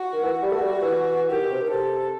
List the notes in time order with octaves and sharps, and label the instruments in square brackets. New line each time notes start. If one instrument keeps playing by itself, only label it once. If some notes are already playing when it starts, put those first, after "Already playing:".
Already playing: [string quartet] F#4
[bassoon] D#3
E3
G3
[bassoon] A3 [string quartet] F#4
[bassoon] G3
G3
E3
[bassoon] D#3 [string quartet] G4
[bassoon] B2
C3
D#3
[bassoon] C3 [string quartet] A4